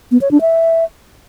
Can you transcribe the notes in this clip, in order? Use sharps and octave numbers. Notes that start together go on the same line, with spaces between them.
B3
C#5
D4
E5